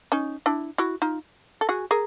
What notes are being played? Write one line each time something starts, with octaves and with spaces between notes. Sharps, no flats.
C#4 D#4
D4 E4
E4 F#4
D#4 F4
A4
F#4 G#4
G#4 A#4